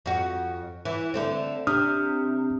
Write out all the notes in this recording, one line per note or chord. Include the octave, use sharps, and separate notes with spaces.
F2 F#4
E3
D3 A3 C4
C3 D4 D#6 F6